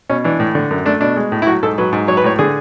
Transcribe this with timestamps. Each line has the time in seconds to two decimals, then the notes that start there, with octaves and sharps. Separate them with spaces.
0.10 B2 C#4
0.24 E3 D4
0.40 A2
0.55 D3
0.71 F#2
0.85 A3 D4
1.01 B2 D4
1.16 G#3
1.32 A2
1.42 E4
1.47 F#3 F#4
1.63 G#2 A4
1.78 F#3 B4
1.93 G#2
2.08 F#3 C#5
2.17 B4
2.24 A2 C#5
2.39 D3 G#4